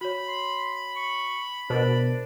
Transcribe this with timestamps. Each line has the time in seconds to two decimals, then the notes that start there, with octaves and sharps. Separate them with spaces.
0.01 F#4 C#5 B5
0.27 C6
0.96 C#6
1.70 B2 D4 A#4 C5